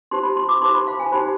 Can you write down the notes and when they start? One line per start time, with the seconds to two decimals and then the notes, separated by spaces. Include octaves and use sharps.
0.11 D#4 G4 C5 C6
0.23 B5
0.37 C6
0.49 D6
0.61 D#4 G4 C5 C6
0.75 B5
0.87 F5
1.00 G#5
1.12 D#4 G4 C5 B5